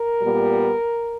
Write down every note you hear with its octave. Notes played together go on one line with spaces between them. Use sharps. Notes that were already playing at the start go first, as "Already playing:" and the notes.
Already playing: A#4
A#2 G3 B3